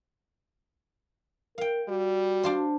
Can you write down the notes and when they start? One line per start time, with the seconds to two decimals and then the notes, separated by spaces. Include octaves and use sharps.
1.58 A#4 F5 G5
1.88 G3 F#4
2.43 D4 F4 C5